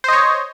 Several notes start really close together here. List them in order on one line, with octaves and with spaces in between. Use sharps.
C5 D#5 C#5